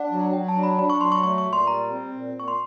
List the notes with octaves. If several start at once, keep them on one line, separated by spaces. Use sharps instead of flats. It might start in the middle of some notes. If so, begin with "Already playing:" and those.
Already playing: D4 F#5
F#3
F#3 G5
A5
D4
B5
D4 B5
C#6
F#3 C6
C#6
A3 C#6
C#6
A#2
C6
G3 A#5
C4
A#2
A#2
C#6
C6